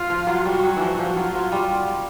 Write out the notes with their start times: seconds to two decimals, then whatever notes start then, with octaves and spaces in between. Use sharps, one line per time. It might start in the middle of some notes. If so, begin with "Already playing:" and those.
Already playing: F4
0.10 F3
0.27 F#3
0.45 G3 F#4
0.64 F#3
0.77 E3 F3 F#4
0.99 F3
1.16 F#3 F4
1.35 F#3
1.52 G3